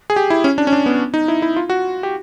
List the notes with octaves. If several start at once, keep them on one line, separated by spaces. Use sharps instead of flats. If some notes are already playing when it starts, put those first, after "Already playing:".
G#4
G4
E4
C#4
D4
C#4
D4
B3
D#4
E4
E4
F4
F#4
G4